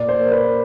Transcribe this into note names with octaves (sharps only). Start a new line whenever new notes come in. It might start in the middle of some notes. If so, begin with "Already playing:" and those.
Already playing: A#2 D5
C5
A#3
B4